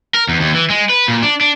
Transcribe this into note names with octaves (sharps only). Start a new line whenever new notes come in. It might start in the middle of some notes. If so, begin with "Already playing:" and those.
A#4
E2
D#2
E3
G#3
B4
A#2
D4
D4